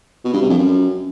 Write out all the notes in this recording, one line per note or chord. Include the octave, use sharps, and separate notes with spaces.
B2
G2
C3
F2
F#2